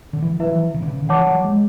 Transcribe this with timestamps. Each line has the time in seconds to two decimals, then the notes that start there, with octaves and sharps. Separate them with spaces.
0.13 D3
0.22 E3
0.40 E3 E4 B4 E5
0.47 F#3
0.55 E3
0.74 C#3
0.82 D3
0.88 C#3
1.02 D3
1.09 E3 C#5 F#5 A5 D6
1.27 F#3
1.44 G#3